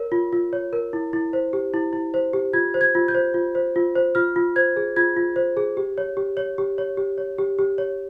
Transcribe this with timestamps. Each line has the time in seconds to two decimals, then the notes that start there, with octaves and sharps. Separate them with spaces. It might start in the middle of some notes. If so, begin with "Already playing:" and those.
Already playing: A#4 C#5
0.12 F4
0.33 F4
0.53 C#5
0.73 A#4
0.93 E4
1.13 E4
1.33 C5
1.53 G4
1.74 E4
1.93 E4
2.14 C5
2.33 G4
2.53 F4 G#6
2.74 C5
2.81 G#6
2.95 F4
3.08 G6
3.14 C5
3.34 F4
3.55 C5
3.76 F4
3.95 C5
4.15 F4 F6
4.36 F4
4.56 C5 G#6
4.77 G#4
4.96 F4 G#6
5.17 F4
5.36 C5
5.57 G#4
5.77 G4
5.98 C#5
6.17 G4
6.37 C#5
6.58 G4
6.78 C#5
6.97 G4
7.18 C#5
7.38 G4
7.59 G4
7.78 C#5